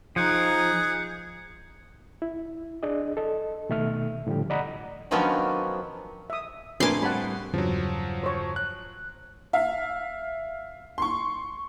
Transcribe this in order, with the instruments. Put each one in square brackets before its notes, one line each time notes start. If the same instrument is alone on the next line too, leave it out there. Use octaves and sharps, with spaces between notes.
[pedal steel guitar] F3 [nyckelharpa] D#4 A#5 [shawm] G#4 [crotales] F#6 G6 C#7
[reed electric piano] E4
D4 G#4 D5 D#5
A4 D#5
B2 D#3 A3 E5 F6
A2 D3 F3 G3 G4
D5 D#5 F#5 A#5 B5
[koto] D#3 F3 F#3 B3 C#4 D4
[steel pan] E5 D#6
[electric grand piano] A2 [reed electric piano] C4 A#4 [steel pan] D4 B4 G#5 [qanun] C6 D6
[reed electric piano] G3 C4 [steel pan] F#5 A5 B5
[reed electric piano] E2 G2 C#3 [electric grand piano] F3 F#3
[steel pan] C5 C#5
[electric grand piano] F#6
[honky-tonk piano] E5 F5
C6 C#6